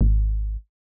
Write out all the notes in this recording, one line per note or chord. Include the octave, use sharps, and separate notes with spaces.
G#1